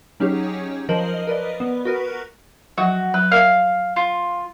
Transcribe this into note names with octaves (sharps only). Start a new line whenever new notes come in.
F#3 C#4 D#4 G4 G#4 C#5
F3 A#4 C5 D#5 F#7
D#5
A#4 B4 D5 D#5
B3
F#4 A#4 B4
F3 F#3 F#4
F#3 B4
A#4 D5 E5 F5
F4